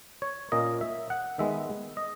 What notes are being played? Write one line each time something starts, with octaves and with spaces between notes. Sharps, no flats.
C#5
A#2 A#3 C#4 D#5
E5
F#5
D#3 G#3 B3 E5
D#5